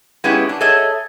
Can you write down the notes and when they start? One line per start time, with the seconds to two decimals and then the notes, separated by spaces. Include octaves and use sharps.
0.24 G#3 B3 C#4 D#4 E4 G4
0.49 D4
0.61 G#4 A4 C#5 D#5 E5